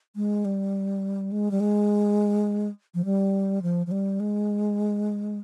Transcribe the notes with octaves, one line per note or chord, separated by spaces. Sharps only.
G#3
G3
G#3
G3
G#3
F3
G3
F3
F3
G3
G#3